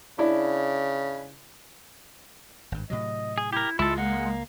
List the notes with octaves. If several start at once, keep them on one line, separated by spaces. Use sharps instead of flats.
C#3 D4 E4
G#1 G2
A2 C3 F#3 D#5
G#4
E4 G4 A#4
C#2 G#3 E4 F4 A4
A#3 F#5